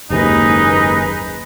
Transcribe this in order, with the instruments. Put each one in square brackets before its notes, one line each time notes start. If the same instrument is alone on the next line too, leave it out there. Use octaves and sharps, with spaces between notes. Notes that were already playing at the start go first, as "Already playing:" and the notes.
[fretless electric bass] F#1 D#2 G#2 [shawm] D#4 [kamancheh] G#4 B4